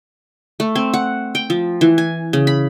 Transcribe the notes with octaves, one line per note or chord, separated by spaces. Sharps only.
A3
C4
F#5
G5
F3
E3
G#5
C#3
B5